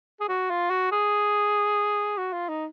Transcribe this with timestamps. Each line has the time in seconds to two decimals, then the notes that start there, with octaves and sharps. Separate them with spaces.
0.20 G#4
0.29 F#4
0.50 F4
0.70 F#4
0.92 G#4
2.18 F#4
2.33 F4
2.49 D#4